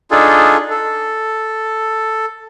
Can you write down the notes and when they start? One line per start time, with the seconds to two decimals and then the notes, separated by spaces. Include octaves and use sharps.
0.11 D4 D#4 F4 G#4 A4
0.70 A4